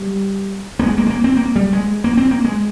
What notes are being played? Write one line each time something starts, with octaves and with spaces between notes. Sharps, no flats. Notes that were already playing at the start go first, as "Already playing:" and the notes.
Already playing: G3
A#3
G#3
A#3
G#3
A#3
C4
A#3
G3
G#3
A#3
C4
A#3
G#3